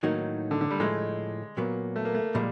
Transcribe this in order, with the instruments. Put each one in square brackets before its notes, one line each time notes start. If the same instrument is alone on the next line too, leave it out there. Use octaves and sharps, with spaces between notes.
[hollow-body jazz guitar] A2 F#3 A#3 D#4 F#4 [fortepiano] D#3
[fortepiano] D3
D3
G3
[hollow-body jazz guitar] A2 F3 A3 [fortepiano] G#3
[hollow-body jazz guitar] A#2 F#3 B3 [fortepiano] A#3
[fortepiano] A3
A#3
A3
[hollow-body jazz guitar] A#2 F3 G#3 [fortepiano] G3